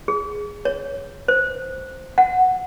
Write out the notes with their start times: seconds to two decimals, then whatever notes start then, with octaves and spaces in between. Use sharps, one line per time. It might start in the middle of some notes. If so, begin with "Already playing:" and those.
0.08 G#4
0.65 C#5
1.28 C5
2.18 F#5